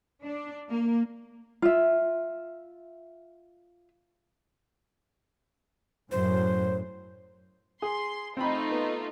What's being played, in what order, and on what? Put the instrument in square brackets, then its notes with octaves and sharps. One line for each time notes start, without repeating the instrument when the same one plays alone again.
[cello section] D4
A#3
[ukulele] F4 E5
[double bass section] F#2 A2 F#3 [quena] C5
[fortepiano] G#4 [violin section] C6
[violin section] A3 D#4 F4 [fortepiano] C4 G5 B5
[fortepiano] B3